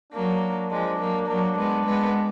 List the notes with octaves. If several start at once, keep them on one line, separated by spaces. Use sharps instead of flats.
F#3 A#3 D4
F3 G#3 D4
F#3 A#3
F#3 A#3 D4
G#3 B3
G#3 B3